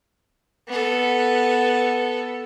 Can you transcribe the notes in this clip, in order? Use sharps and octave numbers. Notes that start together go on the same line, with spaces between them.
B3 A4